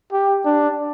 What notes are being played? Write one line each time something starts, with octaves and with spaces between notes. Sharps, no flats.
G4
D4